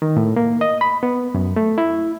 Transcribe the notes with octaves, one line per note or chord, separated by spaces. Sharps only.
D#3
A2
A#3
D#5
B5
B3
F#2
A3
E4